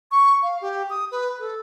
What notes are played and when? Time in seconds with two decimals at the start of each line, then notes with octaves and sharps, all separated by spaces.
0.11 C#6
0.43 F5
0.61 G4
0.90 D#6
1.11 B4
1.39 A4